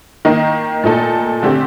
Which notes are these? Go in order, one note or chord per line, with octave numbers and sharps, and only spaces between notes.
D#3 A#3 D#4
A#2 A3 D#4 A4
D3 A3 C4 G4